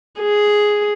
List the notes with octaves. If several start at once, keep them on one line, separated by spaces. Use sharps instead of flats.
G#4